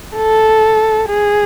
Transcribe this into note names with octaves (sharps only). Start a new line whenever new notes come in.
A4
G#4